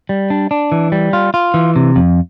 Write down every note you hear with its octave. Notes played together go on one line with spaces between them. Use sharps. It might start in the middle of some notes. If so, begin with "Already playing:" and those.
G3
D4
D4
E3
G3
F4
F4
E3
C3
F2